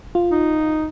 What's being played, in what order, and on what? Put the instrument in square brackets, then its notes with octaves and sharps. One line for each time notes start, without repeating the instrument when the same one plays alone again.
[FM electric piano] F4
[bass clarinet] D#4